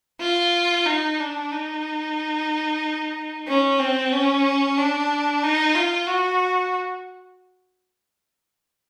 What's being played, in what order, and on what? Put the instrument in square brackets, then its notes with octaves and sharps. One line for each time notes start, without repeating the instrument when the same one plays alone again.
[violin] F4
D#4
D4
D#4
C#4
C4
C#4
D4
D#4
F4
F#4